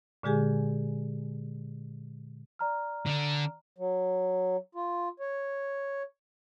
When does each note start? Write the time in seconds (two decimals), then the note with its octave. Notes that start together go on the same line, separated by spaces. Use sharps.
0.23 A#2 D3 G#3 G4 G#4 G#5
2.59 D5 A#5 F6
3.07 D3 D4
3.78 F#3
4.75 F4
5.20 C#5